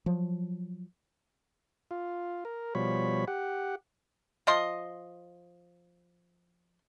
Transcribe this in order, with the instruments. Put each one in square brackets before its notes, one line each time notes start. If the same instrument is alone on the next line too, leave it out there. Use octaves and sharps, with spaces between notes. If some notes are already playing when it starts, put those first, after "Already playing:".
[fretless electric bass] F3 F#3
[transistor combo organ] F4
A#4
B2 F3 G3 C#5 B5
G4 F#5
[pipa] F3 D#5 C6